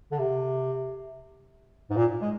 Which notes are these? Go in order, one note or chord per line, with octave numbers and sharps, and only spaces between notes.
D3
C3
G#2
A#2
G#3